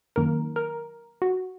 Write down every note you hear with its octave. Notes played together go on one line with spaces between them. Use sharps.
F#2 D#3 A#3 A#4
A#4
F#4